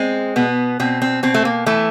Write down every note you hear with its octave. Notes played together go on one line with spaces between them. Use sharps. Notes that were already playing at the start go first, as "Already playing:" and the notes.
Already playing: G#3 C4
B2 B3
B2 C4
C4
B2 C4
A3
A#3
E3 A3